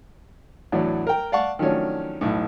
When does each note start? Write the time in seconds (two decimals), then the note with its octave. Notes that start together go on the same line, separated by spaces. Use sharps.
0.72 E2 A2 F#3 D4
1.07 A#4 G5
1.32 D5 F5 F#5 A5 C#6
1.59 D#3 F3 F#3 A3 C#4 D4
2.21 B1 A2